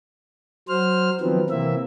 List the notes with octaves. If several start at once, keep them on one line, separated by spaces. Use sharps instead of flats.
F#3 C5 F6
D#3 F3 F#3 B3 C4
C3 E3 A#3 C4 E5